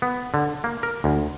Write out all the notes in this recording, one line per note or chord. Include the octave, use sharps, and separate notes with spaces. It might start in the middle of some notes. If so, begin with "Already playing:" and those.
B3
D3
A#3
A#4
D2